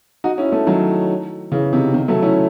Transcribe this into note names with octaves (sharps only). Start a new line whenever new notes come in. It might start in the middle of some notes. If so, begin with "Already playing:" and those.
D#4 F#4
C#4 E4
A3 C#4
D#3 F#3
C#3 E3
C3 D#3
C3 D#3
F#3 A3
C#4 E4